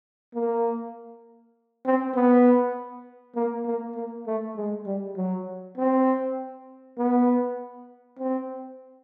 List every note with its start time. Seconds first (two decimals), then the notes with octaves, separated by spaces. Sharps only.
0.34 A#3
1.86 C4
2.15 B3
3.36 A#3
3.66 A#3
3.95 A#3
4.27 A3
4.56 G#3
4.86 G3
5.16 F#3
5.78 C4
6.98 B3
8.19 C4